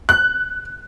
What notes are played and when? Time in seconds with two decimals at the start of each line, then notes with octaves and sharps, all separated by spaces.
0.09 F#6